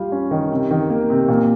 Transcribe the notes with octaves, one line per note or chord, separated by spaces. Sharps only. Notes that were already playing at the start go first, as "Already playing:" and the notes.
Already playing: G3 F4
C#4
D#3
C3
D#3
A#3
C3
A#2